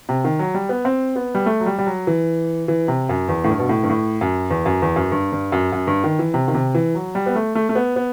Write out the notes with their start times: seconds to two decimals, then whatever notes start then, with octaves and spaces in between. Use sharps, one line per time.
0.09 C3
0.25 D#3
0.39 F#3
0.54 G3
0.69 B3
0.85 C4
1.16 B3
1.35 G3
1.46 A3
1.60 F#3
1.66 G3
1.78 G3
1.87 F#3
2.07 E3
2.68 E3
2.88 C3
3.09 F#2
3.28 E2
3.44 A2
3.50 G2
3.59 B2
3.69 A2
3.83 G2
3.90 A2
4.21 F#2
4.50 E2
4.65 F#2
4.82 E2
4.96 F#2
5.12 G2
5.32 G2
5.52 F#2
5.72 F#2
5.87 G2
6.04 D#3
6.19 E3
6.34 C3
6.48 D#3
6.54 C3
6.75 E3
6.95 F#3
7.15 G3
7.26 B3
7.35 A3
7.55 A3
7.69 A3
7.75 B3
7.96 B3